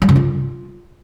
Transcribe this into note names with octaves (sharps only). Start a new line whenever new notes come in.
G3
C#3
F4